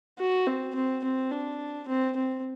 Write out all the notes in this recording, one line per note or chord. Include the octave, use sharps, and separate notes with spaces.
F#4
C4
C4
C4
D4
C4
C4